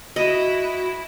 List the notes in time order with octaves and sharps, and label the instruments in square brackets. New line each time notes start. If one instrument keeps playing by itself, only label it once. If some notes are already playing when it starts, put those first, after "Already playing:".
[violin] E4 [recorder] F#4 [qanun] D#5